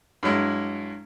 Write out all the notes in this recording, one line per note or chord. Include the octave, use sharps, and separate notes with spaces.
G2 F#3 G#3 E4